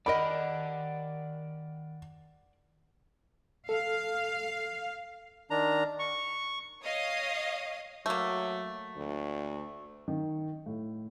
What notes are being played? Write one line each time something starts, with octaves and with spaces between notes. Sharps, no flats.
D#3 G4 A#4 D5 D#5 F#5 B5
A4 F5
D#3 D4 A#5
C#6
C#5 D#5 F5 D#6
F#3 A3 A#3
D2
D#3
A2